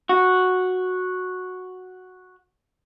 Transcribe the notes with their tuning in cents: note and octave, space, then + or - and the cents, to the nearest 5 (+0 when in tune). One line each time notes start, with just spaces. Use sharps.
F#4 -5